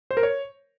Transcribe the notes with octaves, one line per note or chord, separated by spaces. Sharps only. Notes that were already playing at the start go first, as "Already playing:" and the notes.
C5
A#4
C#5